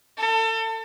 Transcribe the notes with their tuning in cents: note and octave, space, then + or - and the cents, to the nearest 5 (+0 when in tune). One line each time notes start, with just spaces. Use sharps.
A4 +30